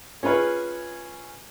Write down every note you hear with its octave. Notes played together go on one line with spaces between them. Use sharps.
C#4 F4 G#4 B4 C#5